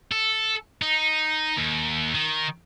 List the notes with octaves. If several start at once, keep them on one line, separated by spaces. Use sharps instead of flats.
A4
D#4
D#2
D#3